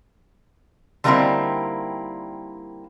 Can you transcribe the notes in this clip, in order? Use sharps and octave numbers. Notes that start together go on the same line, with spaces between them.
D3 G3 A#3 C4 D#4 E4